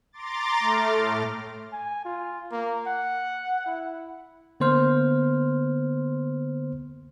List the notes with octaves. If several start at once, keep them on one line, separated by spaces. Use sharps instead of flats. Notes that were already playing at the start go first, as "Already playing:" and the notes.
A#5 C6 D6 A6
A3 F6
A2
G#5
F4
A#3
F#5
E4
D3 A#3 B3 C5 C6 F6